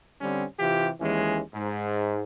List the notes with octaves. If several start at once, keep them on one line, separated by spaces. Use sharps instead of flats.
D3 G3 C4 C#4
C3 E3 F4 G4
D#2 E3 G#3 C#4
G#2